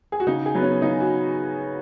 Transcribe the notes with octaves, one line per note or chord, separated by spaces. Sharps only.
G#4
F#4
C#3 D#4
G#4
F#3 B3
C#4
C#3 D#4
F#4